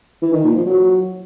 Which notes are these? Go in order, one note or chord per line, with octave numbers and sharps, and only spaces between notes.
E3
D#3
A#2
F3
F#3